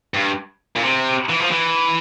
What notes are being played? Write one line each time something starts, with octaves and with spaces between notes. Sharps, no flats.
G2
A#2
C3
E3
F3
E3